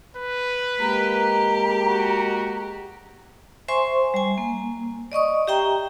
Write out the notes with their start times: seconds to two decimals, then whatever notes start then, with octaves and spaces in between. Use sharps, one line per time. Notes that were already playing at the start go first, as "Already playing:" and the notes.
0.17 B4
0.80 G#3 A#3 G4 A#5
1.84 F#4
3.68 C5 E5 G#5 C6 C#6
4.14 G3 G#5
4.38 A#3
5.12 D5 D#5 C#6 D#6
5.48 G4 E5 G5 A#5